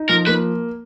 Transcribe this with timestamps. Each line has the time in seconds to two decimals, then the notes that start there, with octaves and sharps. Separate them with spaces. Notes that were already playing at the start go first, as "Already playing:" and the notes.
Already playing: D#4
0.09 F3 A#4
0.27 A#3 B4